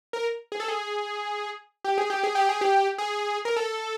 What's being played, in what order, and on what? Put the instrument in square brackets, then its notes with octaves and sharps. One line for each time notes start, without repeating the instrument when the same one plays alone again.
[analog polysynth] A#4
G#4
A4
G#4
G4
G#4
G4
G#4
G4
G#4
G4
G#4
A#4
A4